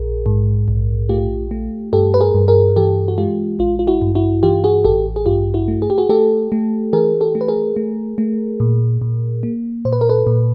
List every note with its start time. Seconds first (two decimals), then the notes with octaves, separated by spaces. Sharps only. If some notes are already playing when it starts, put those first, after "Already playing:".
Already playing: A#1 G#4 A#4
0.26 G#2
0.68 A#1
1.09 A3 F4 G4
1.51 A3
1.93 G2 G4 A4
2.14 B4
2.21 G#4 A#4
2.35 G2
2.48 G#4 A#4
2.76 E3 G4 A4
3.08 F#4
3.18 G#3 F4 G4
3.59 A1 F4
3.79 F4
3.87 E4 F#4
4.02 G2
4.15 E4 F#4
4.43 E3 F4 G4
4.64 F#4 G#4
4.84 A1 G4 A4
5.16 G#4
5.26 G2 F4 G4
5.54 E4 F#4
5.68 A3
5.82 G#4
5.90 G4
5.98 F#4 G#4
6.09 A3 G4 A4
6.52 A3
6.93 E3 G#4 A#4
7.21 G4 A4
7.35 A3
7.41 B4
7.48 G#4 A#4
7.76 A3
8.18 A3
8.60 A#2
9.01 A#2
9.43 A#3
9.85 A#2 C5
9.93 B4
10.01 A#4
10.09 A4 B4
10.27 A#2